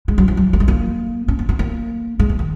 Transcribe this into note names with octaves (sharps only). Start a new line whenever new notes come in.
G#3
F#3
E3
F#3
A#3
G#3
A#3
C#4
B3
B3
A#3
G#3
E3
D#3